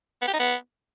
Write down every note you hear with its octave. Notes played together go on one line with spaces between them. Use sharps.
B3
G4
D#4
B3